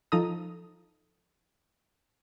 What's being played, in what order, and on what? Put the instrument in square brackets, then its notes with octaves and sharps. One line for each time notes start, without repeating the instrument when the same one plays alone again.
[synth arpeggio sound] F3 D#4 A4 A#5 D#6